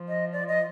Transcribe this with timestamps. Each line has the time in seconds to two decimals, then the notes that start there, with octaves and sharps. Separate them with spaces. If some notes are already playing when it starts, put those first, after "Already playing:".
Already playing: F3
0.08 D#5
0.33 D5
0.48 D#5